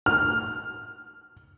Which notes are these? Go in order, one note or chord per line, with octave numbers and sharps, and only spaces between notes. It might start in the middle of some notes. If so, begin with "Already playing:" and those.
F6